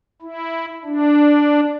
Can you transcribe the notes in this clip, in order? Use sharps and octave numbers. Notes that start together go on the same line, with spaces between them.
E4
D4